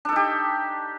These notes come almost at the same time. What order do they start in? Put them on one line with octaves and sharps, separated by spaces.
D4 A4 D#4 G4